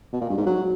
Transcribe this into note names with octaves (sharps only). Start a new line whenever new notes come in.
B2
A#2
G2
G#2
F#3